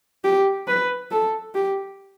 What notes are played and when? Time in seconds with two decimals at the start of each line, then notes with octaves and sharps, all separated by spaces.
0.24 G4
0.68 B4
1.11 A4
1.54 G4